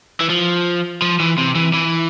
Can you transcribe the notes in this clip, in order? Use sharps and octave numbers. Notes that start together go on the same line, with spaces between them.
E3
F3
F3
E3
C3
E3
E3